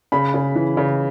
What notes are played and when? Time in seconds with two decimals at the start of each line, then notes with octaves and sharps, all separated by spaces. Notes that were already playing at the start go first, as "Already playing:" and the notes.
0.12 C#3 B5
0.34 C#3
0.55 E3
0.77 C#3